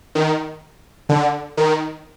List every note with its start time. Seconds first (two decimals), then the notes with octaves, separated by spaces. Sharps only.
0.15 D#3
1.09 D3
1.57 D#3